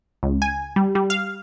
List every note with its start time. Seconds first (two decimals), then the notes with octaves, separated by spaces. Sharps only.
0.23 C#2
0.42 G#5
0.76 G3
0.95 G3
1.10 F5